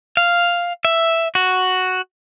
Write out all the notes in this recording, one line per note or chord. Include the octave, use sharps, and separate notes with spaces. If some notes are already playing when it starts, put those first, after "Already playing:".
F5
E5
F#4